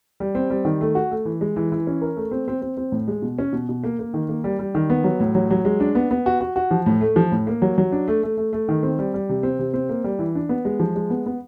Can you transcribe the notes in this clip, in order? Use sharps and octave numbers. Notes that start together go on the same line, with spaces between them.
G3
C4
G3
D#3
A3
F#4
A3
E3
G#3
E3
E3
C#4
A#4
A3
C4
C4
C4
C4
A2
G#3
B2
C#4
B2
B2
A#3
A#3
D#3
A#3
G3
G3
D#3
B3
F#3
A2
F#3
F#3
G#3
D4
B3
B3
F#4
F#4
F#4
F3
A2
A3
F3
A2
A#3
F#3
F#3
D4
A3
A3
A3
A3
D#3
C4
G3
G3
C3
C4
C3
C4
A#3
G3
E3
D4
B3
G#3
F3
G#3
B3
B3